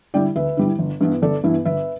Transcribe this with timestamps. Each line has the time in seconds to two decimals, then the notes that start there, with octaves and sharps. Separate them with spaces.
0.14 D3 G3 E4 D5 G5
0.36 D2 B4 E5
0.57 D3 G3 E4
0.79 G1
1.01 G2 E3 B3 E4
1.22 G1 A4 D5
1.44 G2 E3 B3 E4
1.65 G1 B4 E5